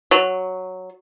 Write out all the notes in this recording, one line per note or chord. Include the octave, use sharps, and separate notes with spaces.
F#3